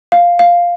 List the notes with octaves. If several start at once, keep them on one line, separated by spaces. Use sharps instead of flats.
F5
F5